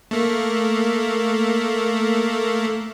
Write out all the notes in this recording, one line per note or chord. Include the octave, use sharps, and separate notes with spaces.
A3 A#3